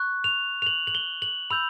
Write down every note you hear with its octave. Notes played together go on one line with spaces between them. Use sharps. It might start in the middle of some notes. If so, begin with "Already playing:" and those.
Already playing: C#6 F#6
F7
F7
F#7
F#7
G7
F#7
B5 E6 G6 F7